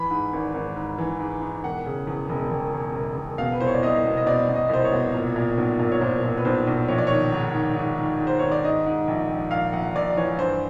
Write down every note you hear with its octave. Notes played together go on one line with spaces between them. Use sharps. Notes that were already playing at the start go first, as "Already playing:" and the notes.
Already playing: E3 B5
G#2
G#1
G#1
G#2
E3
G#2
G#2
E1 F#5
C#3
E2
E1
E1
E1
E1
E1
B2 F5
B4
C2 C5
C#5
D5
C2 D#5
B2
D#5
B2 D5
B2
D#5
C2 C5
C#5
B2
A#2
A#2
B1
A#2
C#5
A#2 C5
A#2
B4
B1 C5
B1
A#1 C#5
D5
D#3 C#5
G#2
D#3
G#2
D#3
G#2
C5
D#3 C#5
D5
G#2 D#5
G#2
A#1
A#1
A#1 F5
A#1 F#5
A#1 D5
E3 C#5
G2 C5